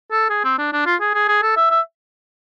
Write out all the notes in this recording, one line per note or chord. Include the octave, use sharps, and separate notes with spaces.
A4
G#4
C4
D4
D4
F4
G#4
G#4
G#4
A4
E5
E5